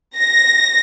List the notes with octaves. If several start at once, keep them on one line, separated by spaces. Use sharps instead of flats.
A#6